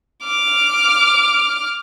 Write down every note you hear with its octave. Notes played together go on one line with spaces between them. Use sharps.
D6 F6